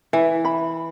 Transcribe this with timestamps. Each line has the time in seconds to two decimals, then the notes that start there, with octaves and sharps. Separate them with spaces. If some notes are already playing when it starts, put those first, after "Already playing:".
0.13 E3 E5
0.45 B5